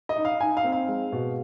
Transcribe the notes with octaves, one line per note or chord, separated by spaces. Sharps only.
D#5
D#4
F5
D#4 G#5
F5
C4
F5
G#3
B2